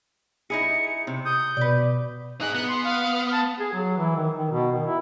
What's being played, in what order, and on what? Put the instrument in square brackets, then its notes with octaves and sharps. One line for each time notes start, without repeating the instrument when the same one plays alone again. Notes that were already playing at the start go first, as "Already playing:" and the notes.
[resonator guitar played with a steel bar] D#4 E4 G#4 [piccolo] C#7
[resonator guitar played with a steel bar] C3
[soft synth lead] D#6 [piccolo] G6
[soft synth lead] B2 [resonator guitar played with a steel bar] B4 D5
[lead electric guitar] D#4 G#4 [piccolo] F#6
[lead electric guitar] B3 [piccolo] F#6
[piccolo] C6
F5
A5
[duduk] G#4
F#3
E3
D#3
D#3
B2
D#3
E4